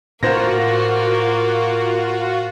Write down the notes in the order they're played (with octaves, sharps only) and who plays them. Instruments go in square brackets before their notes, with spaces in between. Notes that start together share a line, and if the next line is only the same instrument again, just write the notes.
[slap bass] A2 [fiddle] A#3 [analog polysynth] F4 F#4 [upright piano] A#4 C5 A#6